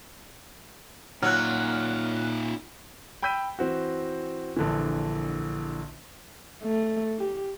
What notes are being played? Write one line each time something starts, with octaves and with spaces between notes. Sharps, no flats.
A#2 F#3 D#4 F4 F6 F#6
G5 B5 E6 G6 B6 D#7
E3 C4 F#4
A#1 D3 E3
A3
G4